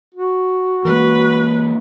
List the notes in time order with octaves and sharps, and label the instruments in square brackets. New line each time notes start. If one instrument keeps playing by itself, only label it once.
[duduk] F#4
[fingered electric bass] E3 G#3 A#3 [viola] B4